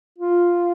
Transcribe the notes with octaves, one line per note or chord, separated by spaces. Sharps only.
F4